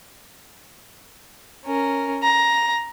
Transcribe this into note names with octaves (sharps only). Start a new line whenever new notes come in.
C#4 A#4
A#5